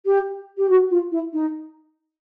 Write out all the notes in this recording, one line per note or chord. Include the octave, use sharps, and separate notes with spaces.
G4
G4
F#4
F4
E4
D#4